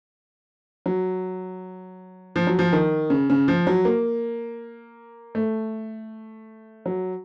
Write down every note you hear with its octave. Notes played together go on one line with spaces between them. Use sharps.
F#3
F3
F#3
F3
D#3
C#3
C#3
F3
F#3
A#3
A3
F#3